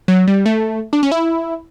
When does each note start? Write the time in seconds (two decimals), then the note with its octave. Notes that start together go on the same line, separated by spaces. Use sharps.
0.08 F#3
0.28 G3
0.46 A3
0.93 D4
1.03 C#4
1.12 E4